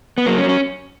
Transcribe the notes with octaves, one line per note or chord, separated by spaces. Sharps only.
B3
F#3 A#3
C#4
F#3
C#4